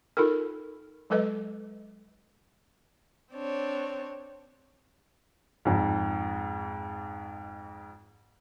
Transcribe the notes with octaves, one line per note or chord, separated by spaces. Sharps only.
D#4 F4 A4 A#4
F#3 G#3 A4 B4 D#5
C4 D4 C#5
F2 G#2